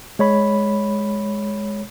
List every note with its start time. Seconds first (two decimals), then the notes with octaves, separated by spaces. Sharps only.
0.19 G#3 C#5 B5